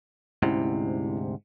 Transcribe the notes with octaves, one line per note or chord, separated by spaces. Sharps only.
D2 G#2 C3 C#4 E4